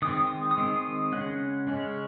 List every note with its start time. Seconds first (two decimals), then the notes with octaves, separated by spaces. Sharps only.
0.02 D#3 G#3 C4 D#6
0.27 D#6
0.51 D#6
0.57 D#3 G#3 C4
0.76 D#6
1.12 C#3 G#3 C#4 F#5
1.67 C#3 G#3 C#4